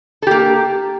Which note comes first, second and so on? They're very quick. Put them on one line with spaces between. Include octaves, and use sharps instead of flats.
A4 G4 A#3